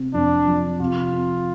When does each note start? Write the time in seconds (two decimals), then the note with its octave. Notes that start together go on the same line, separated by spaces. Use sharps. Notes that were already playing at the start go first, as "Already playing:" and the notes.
Already playing: C3 C4
0.13 F2 D4
0.47 F3
0.80 C3 F4
1.13 C4